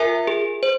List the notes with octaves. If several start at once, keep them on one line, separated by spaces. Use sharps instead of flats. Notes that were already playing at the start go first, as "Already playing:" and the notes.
Already playing: F4 A#4 E5 G#5
G#4
C5